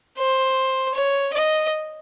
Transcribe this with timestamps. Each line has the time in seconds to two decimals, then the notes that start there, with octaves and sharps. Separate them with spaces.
0.18 C5
0.95 C#5
1.33 D#5